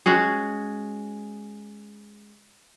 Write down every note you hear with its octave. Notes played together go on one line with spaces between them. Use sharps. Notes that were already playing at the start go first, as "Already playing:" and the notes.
G#3 C#4 F#4 G#4